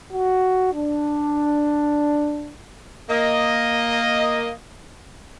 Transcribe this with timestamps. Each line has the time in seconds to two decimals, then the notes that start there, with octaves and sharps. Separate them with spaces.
0.13 F#4
0.73 D4
3.10 A#3 D#5